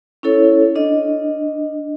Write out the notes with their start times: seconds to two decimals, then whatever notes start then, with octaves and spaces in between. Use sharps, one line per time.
0.23 C#4 E4 A4 C#5
0.76 D4 D#5